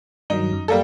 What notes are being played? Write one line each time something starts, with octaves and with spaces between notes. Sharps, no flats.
G2 D#3 F#3 D#4
F#2
G3 A#3 A4